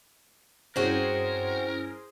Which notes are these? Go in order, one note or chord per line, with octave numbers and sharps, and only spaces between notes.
G2 C4 C#4 E4 F#4 G#4 A#4 C5